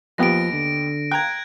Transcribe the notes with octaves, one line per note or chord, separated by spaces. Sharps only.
D#2 F3 B3 G4 A#6 D7
D3
G5 A#5 F#6 G#6